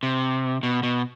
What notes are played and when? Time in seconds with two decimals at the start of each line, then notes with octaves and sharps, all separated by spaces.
0.03 C3
0.63 B2
0.83 B2